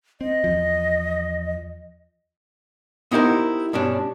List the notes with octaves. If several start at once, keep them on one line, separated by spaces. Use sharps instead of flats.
C4 D#5
E2 F3
B3 D#4 E4 G4 A#4 C5
G2 B2 C#4 D4